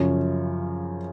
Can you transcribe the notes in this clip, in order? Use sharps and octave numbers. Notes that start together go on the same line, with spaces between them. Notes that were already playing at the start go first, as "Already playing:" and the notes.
Already playing: F#2 C#3 F3 C#5